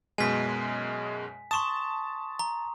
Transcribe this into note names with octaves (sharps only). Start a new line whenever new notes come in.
F#2 B2 G#3 G#5 B6
A5 C6 C#6 D#6 E7
A#5